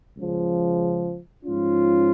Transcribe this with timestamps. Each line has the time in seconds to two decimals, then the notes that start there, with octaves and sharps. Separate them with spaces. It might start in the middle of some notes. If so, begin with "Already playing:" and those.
0.17 C#2 C#3 F3
1.45 G#2 F3 C#4 F4